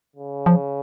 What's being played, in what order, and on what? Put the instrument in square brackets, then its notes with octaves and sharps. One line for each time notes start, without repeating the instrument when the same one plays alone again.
[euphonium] C#3
[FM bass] F3